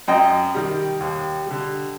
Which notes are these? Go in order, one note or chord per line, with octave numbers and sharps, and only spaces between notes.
F#2 D#5 G5
D#3 G3
D#2
D3 G3